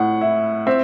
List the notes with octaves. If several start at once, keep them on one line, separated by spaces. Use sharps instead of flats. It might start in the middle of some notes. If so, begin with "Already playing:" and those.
Already playing: A2 F#5
E4
C4 E5